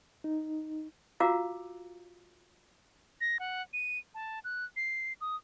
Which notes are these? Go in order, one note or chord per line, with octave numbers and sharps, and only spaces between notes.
D#4
F4 F#4 F5 A#5 D6 E6
A#6
F#5
D#7
A5
F#6
C7
D#6